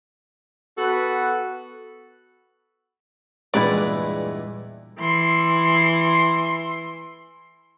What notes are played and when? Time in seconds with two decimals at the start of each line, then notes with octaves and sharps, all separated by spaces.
0.78 B3 F#4 A4 B4
3.54 E2 G2 A#2 G3 G#3 E4 B4 D5
5.00 E3 C6